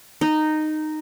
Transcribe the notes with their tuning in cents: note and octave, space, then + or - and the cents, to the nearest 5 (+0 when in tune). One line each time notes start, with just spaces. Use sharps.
D#4 -10